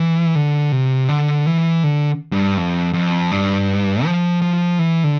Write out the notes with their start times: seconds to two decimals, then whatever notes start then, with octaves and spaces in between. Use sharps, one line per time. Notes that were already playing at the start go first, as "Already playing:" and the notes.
Already playing: E3
0.35 D3
0.72 C3
1.09 D3
1.47 E3
1.84 D3
2.32 G2
2.57 F2
2.93 F2
3.32 G2
4.05 F3
4.42 F3
4.79 E3
5.04 D3